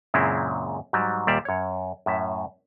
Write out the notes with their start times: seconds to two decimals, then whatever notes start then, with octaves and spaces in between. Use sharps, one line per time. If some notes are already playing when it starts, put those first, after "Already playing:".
0.14 F#2 A#2 C#3 G#3 C4 E4
0.93 G#2 F#3 G3
1.27 D#2 A#2 G3 D5 E5 F5
1.45 F#2 C#5
2.06 F#2 A2 E5